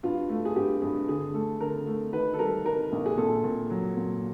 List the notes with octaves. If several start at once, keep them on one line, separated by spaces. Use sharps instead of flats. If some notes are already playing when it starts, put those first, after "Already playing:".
G2 F4
A3
G#4
G2 G4
G2 G#4
D3 G#4
A3 A4
D3 A#4
A3
D#3 B4
A4
G3 A#4
D#3 A#4
A#1
G#4
A#2 A4
A#2
F#3
A#2